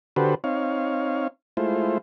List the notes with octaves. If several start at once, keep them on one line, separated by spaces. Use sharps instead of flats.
D3 F#4 G4 A4 B4 C5
C4 D#4 C#5 F5
G#3 A3 E4 F4 C5